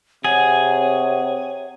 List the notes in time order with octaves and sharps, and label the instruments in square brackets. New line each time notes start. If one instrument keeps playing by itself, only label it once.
[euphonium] C3 [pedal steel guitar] G#4 G#5 [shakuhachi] C#5 [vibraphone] F#5